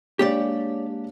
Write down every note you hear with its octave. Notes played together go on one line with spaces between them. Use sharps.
G#3 A#3 D4 G4 C#5 D5